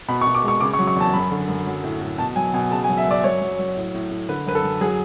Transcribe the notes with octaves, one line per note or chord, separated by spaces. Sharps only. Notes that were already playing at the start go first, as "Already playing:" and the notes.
B2 B5
C#6
B2
D6
G#3 C#6
C#3 D6
C#6
F#3
C#6
E2 A5
F#2 B5
D3
F#2
F#3
A2
A2
B2 A5
F#3 G#5
B2 G#5
C#3 A5
G#5
F#3
E5
F#2 D5
F#3 C#5
F#3
F#3
A2
A2
A2
D3 B4
F#2 B4
A4
F#2
F#3 G#4